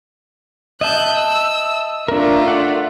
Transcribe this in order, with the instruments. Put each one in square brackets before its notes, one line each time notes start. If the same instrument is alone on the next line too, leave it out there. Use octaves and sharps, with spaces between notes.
[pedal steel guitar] D#5 E5 A5 [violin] F#6 G6
[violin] E6
[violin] A3 F4 [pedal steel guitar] D4 A#4
[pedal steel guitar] D5 F#5